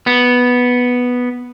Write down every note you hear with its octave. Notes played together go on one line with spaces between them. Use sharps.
B3